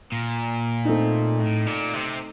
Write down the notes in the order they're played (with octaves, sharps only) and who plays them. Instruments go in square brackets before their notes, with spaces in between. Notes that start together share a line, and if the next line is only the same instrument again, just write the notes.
[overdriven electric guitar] A#2
[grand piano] A3 C4 D#4
[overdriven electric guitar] A2
A#2
C3